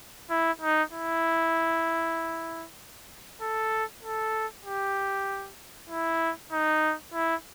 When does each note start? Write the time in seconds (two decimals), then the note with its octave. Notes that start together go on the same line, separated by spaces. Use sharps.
0.30 E4
0.61 D#4
0.92 E4
3.41 A4
4.03 A4
4.65 G4
5.89 E4
6.52 D#4
7.14 E4